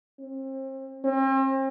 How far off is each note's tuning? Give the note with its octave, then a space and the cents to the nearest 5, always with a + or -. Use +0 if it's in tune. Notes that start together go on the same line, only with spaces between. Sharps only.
C4 +35
C4 +40